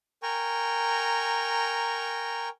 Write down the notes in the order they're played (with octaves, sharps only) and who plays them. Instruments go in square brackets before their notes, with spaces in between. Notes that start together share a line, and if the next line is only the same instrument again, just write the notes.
[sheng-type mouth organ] A#4 G5 G#5 A#5 C#6